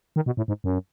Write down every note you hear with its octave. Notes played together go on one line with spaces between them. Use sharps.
D#3
B2
A2
G#2
F#2